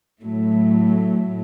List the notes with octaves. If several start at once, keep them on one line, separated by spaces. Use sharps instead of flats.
A2 F#3 A3